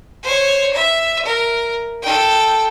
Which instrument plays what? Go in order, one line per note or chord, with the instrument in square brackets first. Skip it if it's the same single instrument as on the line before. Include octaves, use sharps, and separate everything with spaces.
[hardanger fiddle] C5 C#5
E5
A#4
A4 G5